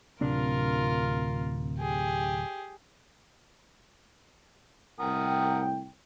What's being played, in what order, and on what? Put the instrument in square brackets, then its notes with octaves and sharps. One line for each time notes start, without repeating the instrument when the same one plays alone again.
[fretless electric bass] D1 C3 D4 [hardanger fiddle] F4 A#4
[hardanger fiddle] G4 G#4
[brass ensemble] C2 A2 G5 [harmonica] A#4 F#5 D#6